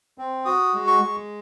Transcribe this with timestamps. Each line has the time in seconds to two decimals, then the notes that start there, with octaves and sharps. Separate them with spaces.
0.18 C4
0.45 F#4 D#6
0.74 G#3
0.87 C#6
1.01 G#3